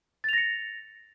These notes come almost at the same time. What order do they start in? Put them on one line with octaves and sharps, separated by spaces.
A6 F7 A#6 C#7